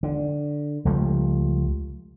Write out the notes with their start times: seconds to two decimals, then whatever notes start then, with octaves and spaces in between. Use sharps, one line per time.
0.03 D3
0.85 C#2 F3 G3 A3